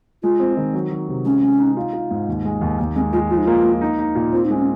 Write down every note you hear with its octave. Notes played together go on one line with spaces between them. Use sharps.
G#3 F4
C4
D#3
F#3
F#3
C3
G#3 C#4
G#3
D#4
F4
F4
G#2
D#2
G#3
D#2
D#2 A#3
G#3 C4
G#3 F4
F3 F4
D#4
A#3 F4
A#3
D#4
D#4
A#2
C4 F4
D#4
G#3
C#4